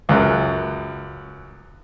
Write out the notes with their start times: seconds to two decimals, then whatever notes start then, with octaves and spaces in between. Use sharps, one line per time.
0.09 C#2 F#2